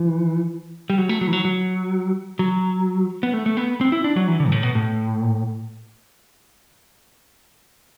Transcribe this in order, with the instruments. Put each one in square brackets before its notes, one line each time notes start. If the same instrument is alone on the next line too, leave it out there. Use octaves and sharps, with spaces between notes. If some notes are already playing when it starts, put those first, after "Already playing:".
Already playing: [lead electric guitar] E3
G3
F#3
A3
F#3
E3
F#3
F#3
F#3
B3
A3
A3
B3
C4
E4
D4
F#3
E3
D3
G2
A2
B2
A2